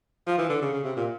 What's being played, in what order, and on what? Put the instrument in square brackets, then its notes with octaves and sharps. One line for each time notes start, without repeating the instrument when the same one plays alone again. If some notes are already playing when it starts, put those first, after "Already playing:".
[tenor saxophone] F3
E3
D3
C#3
C#3
C3
A#2